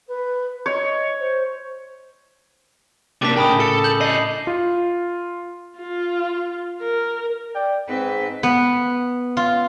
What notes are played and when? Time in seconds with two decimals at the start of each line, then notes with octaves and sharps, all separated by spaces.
0.07 B4
0.66 C#5 D#5
1.19 C5
3.22 C3 A#3 D4 D6 B6
3.36 D2 A2 C#3 A#4 G5 A5 B5 D#6
3.60 A4 C#7
3.84 G6 F#7
4.01 D4 D#5 C7
4.47 F4
5.78 F4
6.81 A#4
7.55 D5 G5
7.88 G#2 C4 B4
8.43 B3
9.37 F4